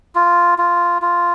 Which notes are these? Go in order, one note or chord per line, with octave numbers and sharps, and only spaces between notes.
F4
F4
F4